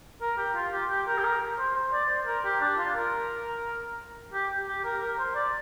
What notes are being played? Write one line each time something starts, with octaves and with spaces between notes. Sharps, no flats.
A#4
G4
F4
G4
G4
A#4
G4
A#4
C5
C5
D5
C5
A#4
G4
D4
F4
A#4
G4
G4
A#4
A#4
C5
D5